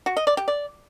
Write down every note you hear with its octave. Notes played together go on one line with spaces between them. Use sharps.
F#4
D#5
D5
G4
D5